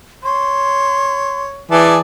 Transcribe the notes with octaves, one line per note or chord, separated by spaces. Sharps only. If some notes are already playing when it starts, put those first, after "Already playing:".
C#5 C6
E3 G#4 D5 A5